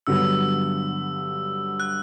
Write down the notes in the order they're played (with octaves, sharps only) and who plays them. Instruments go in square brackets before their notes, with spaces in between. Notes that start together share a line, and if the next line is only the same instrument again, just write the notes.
[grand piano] G2 D3 F#3 B3 [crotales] E6
[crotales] F#6